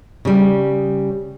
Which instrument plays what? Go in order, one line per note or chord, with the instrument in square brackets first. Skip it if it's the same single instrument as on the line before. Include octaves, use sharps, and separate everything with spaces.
[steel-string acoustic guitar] C#3 G3